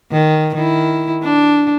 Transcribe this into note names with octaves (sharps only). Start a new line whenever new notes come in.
D#3
D#3 E4
D4